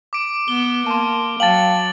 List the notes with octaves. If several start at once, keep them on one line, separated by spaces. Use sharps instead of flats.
D6 D7
B3 G7
A#3 A5 C6
F#3 F5 G5 A5 A6 F#7